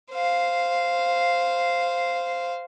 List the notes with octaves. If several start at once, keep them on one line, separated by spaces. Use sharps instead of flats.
C5 F5